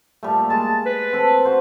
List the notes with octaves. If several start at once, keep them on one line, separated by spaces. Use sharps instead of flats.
A#2 G3 A3
G#3 A5
B4
C4 A4
F#4 C5